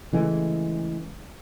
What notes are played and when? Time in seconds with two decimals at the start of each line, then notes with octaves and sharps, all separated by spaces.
0.13 C#3 E3 G#3 A3